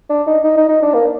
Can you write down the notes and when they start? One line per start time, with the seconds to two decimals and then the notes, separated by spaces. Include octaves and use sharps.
0.10 D4
0.27 D#4
0.44 D#4
0.57 D#4
0.69 D#4
0.82 D4
0.94 A#3